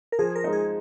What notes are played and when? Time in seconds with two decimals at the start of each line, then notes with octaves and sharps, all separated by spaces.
0.12 A#4
0.19 F3 G#4
0.35 A#4
0.44 G#3 D#4
0.53 G#4